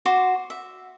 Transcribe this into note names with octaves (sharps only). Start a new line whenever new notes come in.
F#4 C5 C6 D6
E5